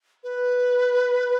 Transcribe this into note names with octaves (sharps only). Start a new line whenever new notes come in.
B4